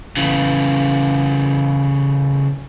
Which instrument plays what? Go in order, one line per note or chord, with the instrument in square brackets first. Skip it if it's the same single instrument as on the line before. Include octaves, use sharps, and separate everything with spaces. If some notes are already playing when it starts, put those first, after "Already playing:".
[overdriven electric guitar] C#3 E3